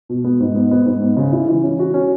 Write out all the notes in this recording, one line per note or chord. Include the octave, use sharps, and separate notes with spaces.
B2
B3
G#2
B3
B3
G#2
B3
C#3
E4
E3
C#4
F#4
C#4